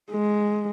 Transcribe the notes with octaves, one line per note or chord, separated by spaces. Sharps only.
G#3